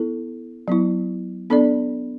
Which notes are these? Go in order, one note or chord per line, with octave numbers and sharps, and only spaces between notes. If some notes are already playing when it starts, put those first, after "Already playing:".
Already playing: B3 E4 A4
F#3 B3 E4
B3 D4 A4 D5